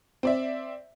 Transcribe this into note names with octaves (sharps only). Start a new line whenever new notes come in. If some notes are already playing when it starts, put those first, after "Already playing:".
C4 D5 E5